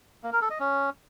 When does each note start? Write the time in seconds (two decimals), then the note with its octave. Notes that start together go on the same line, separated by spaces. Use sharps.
0.24 A#3
0.33 A#4
0.42 A4
0.51 D#5
0.59 C#4